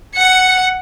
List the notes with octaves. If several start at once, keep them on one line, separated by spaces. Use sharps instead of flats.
F#5 C#7